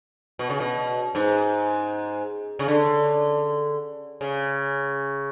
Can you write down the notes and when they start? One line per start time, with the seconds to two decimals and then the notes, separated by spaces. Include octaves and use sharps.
0.39 B2
0.50 C#3
0.60 B2
1.15 G#2
2.59 C#3
2.68 D3
4.21 C#3